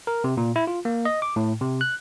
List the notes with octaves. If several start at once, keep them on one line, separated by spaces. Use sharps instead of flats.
A#4
C3
A#2
E4
F4
A#3
D#5
D6
A2
C3
F#6